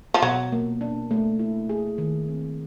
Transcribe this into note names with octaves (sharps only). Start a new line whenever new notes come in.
F3
B2 F#3
A#3
D4
A3
E4
G#4
D#3
C4